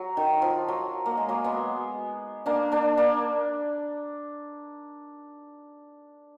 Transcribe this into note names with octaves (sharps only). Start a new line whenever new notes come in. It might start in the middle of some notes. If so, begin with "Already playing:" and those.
Already playing: F#3
D#3
F3
F#3
A#3
G#3
F#3 A#3
G#3 B3
A#3 D4
A#3 D4
A#3 D4